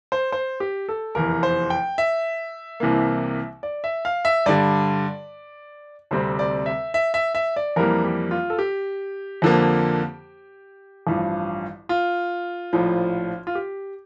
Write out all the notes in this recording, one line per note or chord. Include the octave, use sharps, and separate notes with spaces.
C5
C5
G4
A4
F1 E2 E3 A#4
C5
G5
E5
C2 C3 E3 A#3
D5
E5
F5
E5
G2 D3 G3 D5
D2 C3 G3 C4 C5
D5
E5
E5
E5
E5
D5
F2 E3 G3 A#3 A#4
G4
F4
A4
G4
F2 D3 F3 A#3
A1 G2 F3
F4
A#1 A2 F3
F4
G4